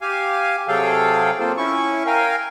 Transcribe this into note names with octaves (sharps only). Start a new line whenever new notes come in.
G4 F5 G#5
C3 F#3 G#4 A4 F5 G5
A#3 C4 F4 A4 C5
C#4 E4 C#6
A#4 F5 G5 G#5